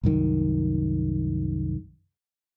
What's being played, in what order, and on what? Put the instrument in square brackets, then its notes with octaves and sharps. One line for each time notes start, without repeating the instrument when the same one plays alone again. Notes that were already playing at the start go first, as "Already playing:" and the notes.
[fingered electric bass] C2 F#2 D#3